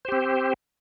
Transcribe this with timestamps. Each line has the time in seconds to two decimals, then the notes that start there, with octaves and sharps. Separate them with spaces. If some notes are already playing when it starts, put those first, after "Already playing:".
0.05 C5
0.08 G4
0.12 C4